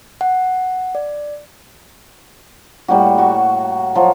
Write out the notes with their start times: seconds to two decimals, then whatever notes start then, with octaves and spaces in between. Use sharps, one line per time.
0.21 F#5
0.95 D5
2.88 A2 G3 A#3 F#4
3.18 F#4 C#6
3.95 F3 F#3 D#5